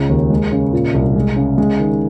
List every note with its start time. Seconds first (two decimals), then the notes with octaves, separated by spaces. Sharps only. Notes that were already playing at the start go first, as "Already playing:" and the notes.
Already playing: C#2 C#3
0.09 D#2
0.30 G#3
0.52 C#3
0.73 A#2
0.94 C2
1.16 G#3
1.36 C#3
1.58 G#3
1.79 D#3